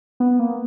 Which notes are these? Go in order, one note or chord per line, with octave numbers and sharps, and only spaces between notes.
B3
A#3